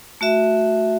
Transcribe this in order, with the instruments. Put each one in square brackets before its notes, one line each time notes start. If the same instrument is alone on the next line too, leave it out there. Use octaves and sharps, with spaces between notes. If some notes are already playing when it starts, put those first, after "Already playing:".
[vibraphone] A3 F#4 E5